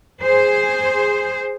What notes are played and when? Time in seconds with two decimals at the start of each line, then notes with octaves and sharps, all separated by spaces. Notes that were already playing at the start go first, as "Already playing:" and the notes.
0.21 G#4 C5